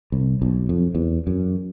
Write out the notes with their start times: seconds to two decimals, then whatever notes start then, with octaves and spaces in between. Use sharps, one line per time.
0.12 C2
0.42 B1
0.69 F2
0.95 E2
1.27 F#2